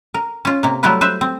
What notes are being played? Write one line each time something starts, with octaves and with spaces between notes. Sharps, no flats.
A#4
C#4 F4
C3 A#3
F#3 G3 A3 E4 F4 B4
B4 C5 E5
C4